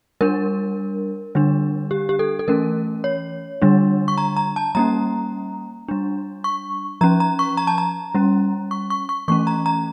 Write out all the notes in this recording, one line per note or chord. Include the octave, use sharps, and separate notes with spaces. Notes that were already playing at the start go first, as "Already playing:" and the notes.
G3 D4 A#4
D3 G3 D4
G4
G4
A4
A4
E3 A3 C#4 A#4
C#5
D3 G3 D4
C#6
A#5
A#5
A5
G3 A#3 C#4 A#5
G3 D4
C#6
F3 C#4 A#5
A#5
C#6
A#5
A5
A#5
G3 C#4
C#6
C#6
C#6
E3 A3 C#4 C#6
A#5
A#5